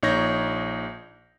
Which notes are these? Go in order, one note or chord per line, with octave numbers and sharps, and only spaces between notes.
A#1 D#4 C#5 G6 A#6